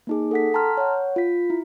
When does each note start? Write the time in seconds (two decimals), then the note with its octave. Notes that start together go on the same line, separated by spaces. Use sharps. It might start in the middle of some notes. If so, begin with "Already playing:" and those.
0.07 A#3 D#4 G#4
0.31 A4 F#5 B6
0.54 G5 A5 A#5 C6 F6
0.77 C#5 F#5
1.16 F4 B6
1.50 E4